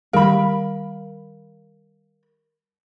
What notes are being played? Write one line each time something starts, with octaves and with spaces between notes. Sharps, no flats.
D#3 G3 A#4 F5 B5